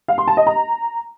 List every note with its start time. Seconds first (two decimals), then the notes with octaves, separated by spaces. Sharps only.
0.08 F5
0.18 C6
0.28 A5
0.37 D#5
0.47 A#5